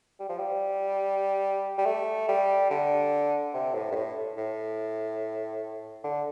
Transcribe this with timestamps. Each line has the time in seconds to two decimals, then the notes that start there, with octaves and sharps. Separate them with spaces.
0.20 G3
0.29 F3
0.38 G3
1.78 G3
1.86 A3
2.28 G3
2.70 D3
3.54 C3
3.74 A2
3.91 G2
3.95 A2
4.37 A2
6.04 D3